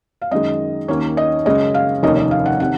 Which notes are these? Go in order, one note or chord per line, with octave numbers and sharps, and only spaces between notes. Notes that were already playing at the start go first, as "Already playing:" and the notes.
F5
F#2 D#3 G#3 D#5
D#2 D#3 A#3 C#4 C#5
D#5
F#2 C#3 G#3 C#4 D#5
F5
F1 D#2 D#3 A#3 C#4 D#5
D#5
F5
F#5
C3 D#3 F#5